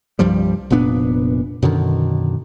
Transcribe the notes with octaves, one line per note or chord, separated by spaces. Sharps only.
C2 G2 F3 G3
F1 A#2 B3 D4
F#2 B2 D3 D#3